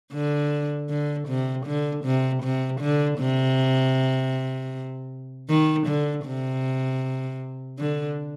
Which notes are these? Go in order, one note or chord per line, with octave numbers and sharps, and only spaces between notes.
D3
D3
C3
D3
C3
C3
D3
C3
D#3
D3
C3
D3